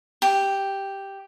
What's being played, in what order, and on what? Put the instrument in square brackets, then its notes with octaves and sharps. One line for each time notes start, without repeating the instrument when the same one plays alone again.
[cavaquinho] G4